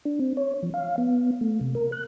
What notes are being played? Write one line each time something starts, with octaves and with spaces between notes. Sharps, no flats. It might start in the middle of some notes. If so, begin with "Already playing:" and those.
D4
C4
C#5
F3
F5
B3
A3
C3
A#4
F#6